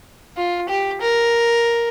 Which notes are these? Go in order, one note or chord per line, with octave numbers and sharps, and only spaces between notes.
F4
G4
A#4